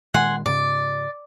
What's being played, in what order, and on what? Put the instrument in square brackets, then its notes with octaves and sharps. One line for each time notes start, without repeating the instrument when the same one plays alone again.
[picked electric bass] A#2 D#3 G#3 [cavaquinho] F#5 G#5 C6
[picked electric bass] G#2 C#3 [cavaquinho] D5